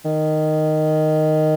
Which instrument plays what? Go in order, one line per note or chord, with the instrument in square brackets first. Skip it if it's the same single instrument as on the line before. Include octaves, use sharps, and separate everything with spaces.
[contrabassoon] D#3